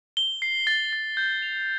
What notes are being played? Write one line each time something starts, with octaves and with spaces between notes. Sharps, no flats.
G7
C7
A6
A6
G6
F7